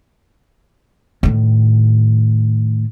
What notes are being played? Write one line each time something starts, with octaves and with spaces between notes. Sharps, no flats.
A2 D#3